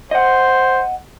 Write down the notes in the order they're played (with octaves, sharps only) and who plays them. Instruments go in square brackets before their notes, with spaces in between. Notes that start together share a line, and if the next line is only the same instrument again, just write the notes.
[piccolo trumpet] C5 [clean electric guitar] D#5 F#5